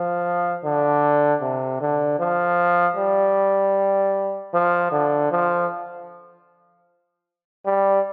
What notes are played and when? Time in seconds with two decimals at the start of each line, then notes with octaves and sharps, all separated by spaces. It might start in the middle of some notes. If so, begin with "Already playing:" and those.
Already playing: F3
0.64 D3
1.42 C3
1.81 D3
2.19 F3
2.97 G3
4.54 F3
4.92 D3
5.31 F3
7.66 G3